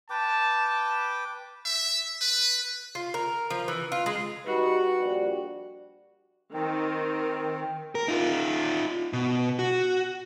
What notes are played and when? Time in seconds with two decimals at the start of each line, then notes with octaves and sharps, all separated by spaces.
0.10 B4 G5 A5 D6
1.65 E5
2.21 B4
2.95 F4
3.14 A#4
3.50 F3
3.68 E3
3.92 F4
4.06 G#3
4.47 G3 D#4 F#4 B4
5.00 A#1 G3
6.54 D#3 C4
7.95 A#4
8.08 D#4 F4
9.13 B2
9.59 F#4